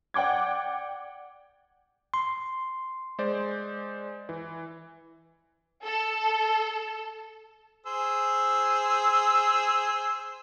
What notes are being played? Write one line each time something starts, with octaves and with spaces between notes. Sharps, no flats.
D5 F#5 G5 D6 G#6
C6
G#3 C5 D5
E3
A4
G#4 C5 E6